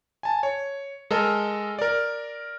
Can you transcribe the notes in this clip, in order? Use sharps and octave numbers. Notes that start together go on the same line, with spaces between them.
G#5 A5
C#5
G#3 A4 A#4 D#5
A#4 D5